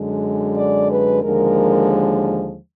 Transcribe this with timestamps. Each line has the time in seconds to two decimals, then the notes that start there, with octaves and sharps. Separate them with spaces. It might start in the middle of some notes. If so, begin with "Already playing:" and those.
Already playing: F#2 D3 G#3
0.57 D5
0.90 B4
1.23 D#2 D3 F3 G#3 A#4